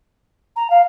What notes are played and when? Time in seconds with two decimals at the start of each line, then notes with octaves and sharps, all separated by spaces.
0.56 A#5
0.70 F5